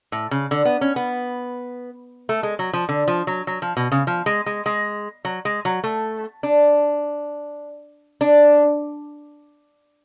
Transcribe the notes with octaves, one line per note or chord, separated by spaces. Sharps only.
A2
C#3
D3
B3
C#4
B3
A3
G#3
F#3
F3
D3
F3
F#3
F#3
F3
B2
C#3
F3
G#3
G#3
G#3
F#3
G#3
F#3
A3
D4
D4